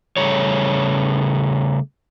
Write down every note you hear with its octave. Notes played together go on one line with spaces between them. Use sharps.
C#3 G3 A3 C#5